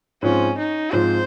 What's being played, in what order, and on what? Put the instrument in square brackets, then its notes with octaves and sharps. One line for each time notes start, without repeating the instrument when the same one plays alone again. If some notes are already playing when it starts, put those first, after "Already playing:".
[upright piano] G#2 F3 C4 F4 [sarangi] C#4
[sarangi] D#4
[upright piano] G#2 F3 C4 F4 [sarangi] C5